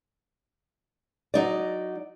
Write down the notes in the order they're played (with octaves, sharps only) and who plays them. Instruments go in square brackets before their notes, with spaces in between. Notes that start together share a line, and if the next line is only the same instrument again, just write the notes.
[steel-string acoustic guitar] F#3 D#4 D5